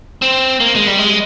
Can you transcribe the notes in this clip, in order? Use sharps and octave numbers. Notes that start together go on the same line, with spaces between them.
C4
A#3
G#3
G3
G#3